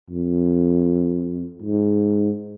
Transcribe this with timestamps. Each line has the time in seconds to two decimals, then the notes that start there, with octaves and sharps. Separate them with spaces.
0.10 F2
1.62 G#2